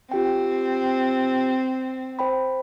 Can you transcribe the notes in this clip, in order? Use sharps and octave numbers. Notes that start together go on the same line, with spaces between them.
C4 F4 G4 G5
C5 G5 B5